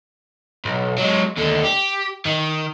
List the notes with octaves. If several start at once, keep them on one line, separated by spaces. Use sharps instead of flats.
B1
F#3 G#3
D#2 D3
G4
D#3